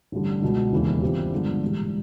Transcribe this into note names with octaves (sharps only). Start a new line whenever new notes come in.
A1 G2 D3 G3
C#2 B2 F#3 B3
E1 D#2 C#3 E3
G2 E3 G3 C4 F4
G2 D3 F3 G#3 B3
A#1 G#2 E3 G3